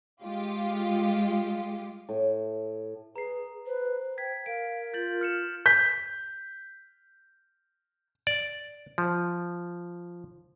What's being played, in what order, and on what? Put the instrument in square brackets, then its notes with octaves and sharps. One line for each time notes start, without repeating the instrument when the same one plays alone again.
[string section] G#3 F4 G4
[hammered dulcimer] A2
[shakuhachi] G#4 [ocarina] B4 [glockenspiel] A#5 C7
[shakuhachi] B4 [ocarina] C5
[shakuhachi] G5 [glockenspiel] G#6 B6
[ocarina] A#4 [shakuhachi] F5 [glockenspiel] D7
[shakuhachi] F4 [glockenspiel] G6 A6 F#7
[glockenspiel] F6 C#7 E7
[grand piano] G6 B6
[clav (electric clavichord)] D5
F3